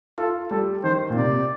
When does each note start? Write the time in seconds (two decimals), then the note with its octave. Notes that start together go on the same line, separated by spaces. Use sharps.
0.18 F4 A4
0.51 G3 A4
0.84 D#3 C5
1.10 A#2
1.16 C3 D5